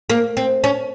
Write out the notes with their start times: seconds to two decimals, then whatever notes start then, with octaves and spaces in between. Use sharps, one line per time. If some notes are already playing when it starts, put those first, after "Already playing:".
0.10 A#3
0.37 C4
0.64 C#4